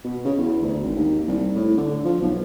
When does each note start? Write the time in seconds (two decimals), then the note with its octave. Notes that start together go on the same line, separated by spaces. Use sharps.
0.04 B2
0.25 C#3
0.37 E2
0.62 D2
0.82 G#1
0.96 D#2
1.27 C2
1.55 A2
1.77 D3
2.05 F3
2.22 B1